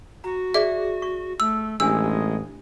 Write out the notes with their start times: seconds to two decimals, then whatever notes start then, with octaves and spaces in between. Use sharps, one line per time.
0.24 F#4 A#5
0.54 G#4 D5 E5 D6
1.02 C#6
1.40 A3 E6
1.80 A1 G#3 D4 G4 G#5 E6